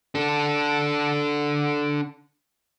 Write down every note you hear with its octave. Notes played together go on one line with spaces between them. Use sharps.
D4 A4